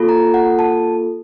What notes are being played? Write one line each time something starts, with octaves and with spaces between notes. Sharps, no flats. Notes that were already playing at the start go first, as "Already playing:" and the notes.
Already playing: A#3 F4 A4
A#5
F#5
A5